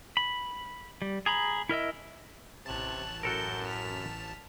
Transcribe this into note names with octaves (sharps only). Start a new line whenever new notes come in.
B5
G3
G#4 A#5 B5
E4 A#4 D#5 E5
A1 C3 C#5 A5 F#6
F#2 F#4 A4 A#4 G6
F6 B6